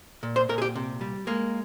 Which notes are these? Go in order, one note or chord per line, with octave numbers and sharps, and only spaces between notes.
A#2
C5
A#2 A#4
G#4
G4
C3
G3
G#3 A#3